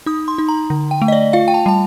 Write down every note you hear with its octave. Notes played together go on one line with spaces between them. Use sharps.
D#4 D#6
C6
D#4
A#5
D3
G5
A3
D#5
D5
F4 F5
G5
A5
G3 A5